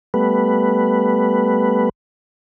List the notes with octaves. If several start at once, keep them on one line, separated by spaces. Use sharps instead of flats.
G3 A3 B3 B4